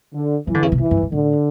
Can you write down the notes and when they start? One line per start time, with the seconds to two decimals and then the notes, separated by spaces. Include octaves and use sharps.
0.13 D3
0.47 E3 F#3
0.54 D3
0.63 C#3
0.72 B2
0.80 E2 E3
0.91 G2
1.02 G2
1.12 A2 D3